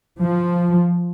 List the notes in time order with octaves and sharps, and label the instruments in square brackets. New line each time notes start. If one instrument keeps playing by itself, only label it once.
[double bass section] F3